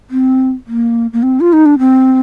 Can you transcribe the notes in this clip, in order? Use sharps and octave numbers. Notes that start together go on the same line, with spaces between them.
C4
A#3
A#3
C4
F4
D#4
D4
C4